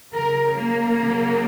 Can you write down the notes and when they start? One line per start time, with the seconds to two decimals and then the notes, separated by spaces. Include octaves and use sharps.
0.12 C#3 F#3 A#4
0.55 A#3
0.98 C#3 F#3